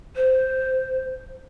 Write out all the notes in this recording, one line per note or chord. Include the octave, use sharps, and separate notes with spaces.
C5